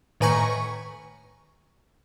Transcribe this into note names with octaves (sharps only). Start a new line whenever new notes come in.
A2 D#3 B4 G#5 A#5 C#6